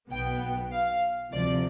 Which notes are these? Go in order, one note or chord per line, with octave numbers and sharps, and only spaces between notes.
B1 B2 B3 G5
F5
D2 C3 F3 D5